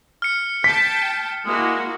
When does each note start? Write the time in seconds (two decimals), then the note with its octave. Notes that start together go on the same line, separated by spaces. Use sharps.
0.22 F6 C#7
0.64 G5 A5 B6
1.46 G#3 A#3 E4 F#4